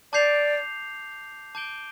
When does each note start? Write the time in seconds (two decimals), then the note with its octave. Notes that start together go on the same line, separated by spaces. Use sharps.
0.13 D5 A5 D6 G6 C7 F7
1.55 A5 D6 G6 D7 G7